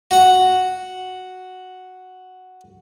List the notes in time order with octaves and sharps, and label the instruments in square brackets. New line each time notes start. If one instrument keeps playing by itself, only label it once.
[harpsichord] F#4 F#5